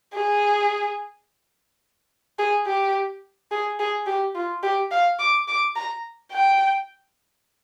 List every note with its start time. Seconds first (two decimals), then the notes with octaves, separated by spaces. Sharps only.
0.14 G#4
2.39 G#4
2.66 G4
3.51 G#4
3.79 G#4
4.07 G4
4.35 F4
4.63 G4
4.91 F5
5.19 D6
5.48 D6
5.76 A#5
6.32 G5